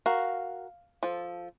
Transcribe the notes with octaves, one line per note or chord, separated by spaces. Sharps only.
F#4 A#4 F5
F3 A4